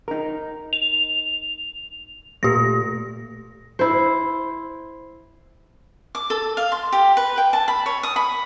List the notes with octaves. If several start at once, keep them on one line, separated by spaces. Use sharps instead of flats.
D#4 A#4
F7
A#2 A3 G4 A#6
E4 C5
D6
A4
F5
C6
G4
B4
G5
A5
B5
C#5
D#6
B5